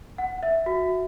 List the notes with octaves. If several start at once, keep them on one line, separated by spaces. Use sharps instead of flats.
F#5
E5
F#4